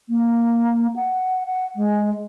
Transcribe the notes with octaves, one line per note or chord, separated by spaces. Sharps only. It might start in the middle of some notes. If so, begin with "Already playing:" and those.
A#3
F#5
F#5
G#3